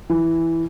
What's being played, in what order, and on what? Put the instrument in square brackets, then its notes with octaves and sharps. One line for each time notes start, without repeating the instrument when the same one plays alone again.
[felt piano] E3